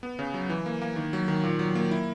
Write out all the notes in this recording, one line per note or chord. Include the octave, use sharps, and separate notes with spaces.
B3
C#3
F#3
E3
A#3
A#3
D#3
F#3
D#3
A#2
F#3
A#3
E4